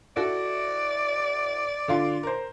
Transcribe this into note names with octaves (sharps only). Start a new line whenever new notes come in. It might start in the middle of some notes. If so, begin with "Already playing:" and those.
E4 F#4 A4 D5
D3 F4 C6
A#4 C5